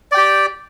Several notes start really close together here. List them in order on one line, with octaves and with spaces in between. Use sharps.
D5 G5 G4